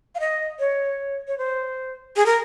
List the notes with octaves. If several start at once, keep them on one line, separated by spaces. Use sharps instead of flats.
F5
D#5
C#5
C#5
C5
G#4
A#4